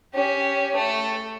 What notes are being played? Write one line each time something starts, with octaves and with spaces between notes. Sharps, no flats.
C#4 G4
A3 A4